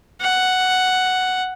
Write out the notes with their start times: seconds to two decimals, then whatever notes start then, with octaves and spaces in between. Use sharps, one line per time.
0.22 F#5